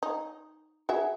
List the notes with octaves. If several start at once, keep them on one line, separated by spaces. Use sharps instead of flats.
D#4
F#4 G#4 E5